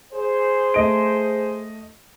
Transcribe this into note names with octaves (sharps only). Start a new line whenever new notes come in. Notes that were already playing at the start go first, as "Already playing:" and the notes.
G#4 C5
A3 D#5 D7